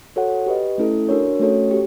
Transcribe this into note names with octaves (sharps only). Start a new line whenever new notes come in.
F#4 A4 C#5 F#5
G4 B4 D#5
A3 C#4 E4 A4
D4 F#4 A#4 C#5
A3 C#4 F#4 A4 C#5
G4